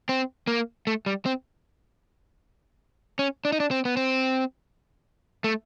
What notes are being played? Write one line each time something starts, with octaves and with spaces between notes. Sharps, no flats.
C4
A#3
A3
G3
C4
C#4
D4
D#4
D4
C4
B3
C4
A3